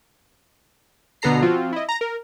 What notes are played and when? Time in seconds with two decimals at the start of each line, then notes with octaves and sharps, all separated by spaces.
1.22 B2 D3 B3 A4 A#5 C7
1.42 F3 C4 F4 F#4
1.73 E4 D#5
1.89 A#5 A#6
2.01 A#4